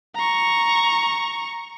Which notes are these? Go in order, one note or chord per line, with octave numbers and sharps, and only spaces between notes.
A#5 C#6